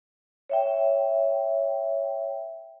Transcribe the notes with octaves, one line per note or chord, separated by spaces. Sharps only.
C#5 E5 G5